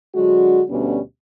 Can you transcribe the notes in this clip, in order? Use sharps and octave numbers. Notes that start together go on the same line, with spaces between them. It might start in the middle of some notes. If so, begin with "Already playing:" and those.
D3 F#3 G#3 D4 F#4
D2 B2 G3 B3 C#4 D4